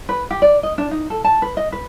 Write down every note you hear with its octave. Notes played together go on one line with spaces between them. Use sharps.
B4
G4
D5
D#5
D4
D#4
A4
A5
B4
D#5
B4